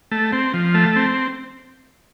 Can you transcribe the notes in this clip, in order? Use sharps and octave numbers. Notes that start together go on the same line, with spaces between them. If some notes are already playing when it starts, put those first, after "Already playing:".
A3
C4
F3
A3
C4